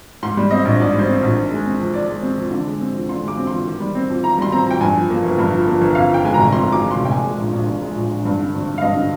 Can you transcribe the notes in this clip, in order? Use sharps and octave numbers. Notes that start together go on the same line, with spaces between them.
G#2 C6
G3
C4 D#5
A#1
G#2 D5
G3 C5
C4
A#1
D#3
G#3
C4
F2
D#3 D5
G#3
C4
F2
D3
G#3
C4
F2
D3 C6
G#3 D6
C4
F2 C6
D#3
G3
C4
F2
D#3 A#5
G3 C6
C4 A#5
F2 G5
G2 G#5
F3
A#3
G1
G2
F3
A#3
G1
F2 F5
D#3 G5
G#3 G#5
F1 A#5
F2 C6
D#3
D6
G#3
F1 C6
G5
A#2 G#5
G#3
A#1
A#1
A#2
G#3
A#1
A#1
G2
D3
G#1
G#1
F5
G2 D#5
D3